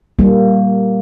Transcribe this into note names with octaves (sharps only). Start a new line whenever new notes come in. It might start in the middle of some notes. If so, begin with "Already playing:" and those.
G3 A#3